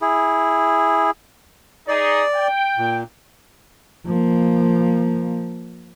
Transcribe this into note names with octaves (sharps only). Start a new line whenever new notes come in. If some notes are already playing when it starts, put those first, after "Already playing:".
E4 G#4
D#4 G#4 D5
G5
A#2
F3 A#3